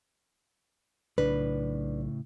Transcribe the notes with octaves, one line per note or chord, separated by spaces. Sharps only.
B1 A2 C#3 D4 B4